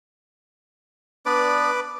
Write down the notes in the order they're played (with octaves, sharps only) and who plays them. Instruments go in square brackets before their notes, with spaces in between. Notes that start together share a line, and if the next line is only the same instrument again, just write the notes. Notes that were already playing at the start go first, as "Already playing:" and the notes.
[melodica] B3 D4 D5 [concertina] B4 D6